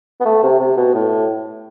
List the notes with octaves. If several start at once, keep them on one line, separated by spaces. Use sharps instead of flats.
B3
A3
C3
C3
B2
A2